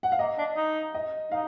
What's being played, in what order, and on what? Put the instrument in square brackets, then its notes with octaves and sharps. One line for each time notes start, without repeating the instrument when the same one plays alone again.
[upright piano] F#5
F5
[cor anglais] A#3 [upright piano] D#5
[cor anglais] D4
D#4
[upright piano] D#5
[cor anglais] D#4 [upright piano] F5